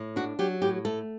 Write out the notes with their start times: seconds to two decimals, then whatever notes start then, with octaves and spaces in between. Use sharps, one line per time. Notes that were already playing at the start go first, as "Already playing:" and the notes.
Already playing: A2
0.16 D4 F#4
0.39 F#3 G4
0.62 A2 G4
0.85 A3 A4